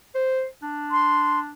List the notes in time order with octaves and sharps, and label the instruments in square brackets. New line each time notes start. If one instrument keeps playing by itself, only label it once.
[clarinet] C5
D4
[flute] C6